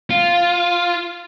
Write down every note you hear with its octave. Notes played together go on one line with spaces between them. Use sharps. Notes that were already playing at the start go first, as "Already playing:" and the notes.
F4